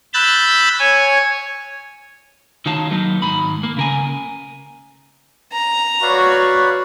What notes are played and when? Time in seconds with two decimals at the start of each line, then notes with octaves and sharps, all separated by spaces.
0.14 B5 E6 F#6 G6 A6
0.79 C#5 G#5
2.66 D#3 D#4 F#4 C#5 F5 A5
2.91 F#3 A#3 B3 D#4
3.22 G#2 D#3 B5
3.63 A#3
3.77 C#3 A#4 G#5
5.52 A#5
6.02 F#4 B4 C#5 D5 F5